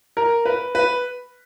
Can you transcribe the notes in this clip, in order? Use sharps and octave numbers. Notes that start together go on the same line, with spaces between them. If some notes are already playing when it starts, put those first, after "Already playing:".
A#4
B4
B4